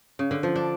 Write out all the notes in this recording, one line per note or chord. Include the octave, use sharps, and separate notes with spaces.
C#3
D3
F3
D4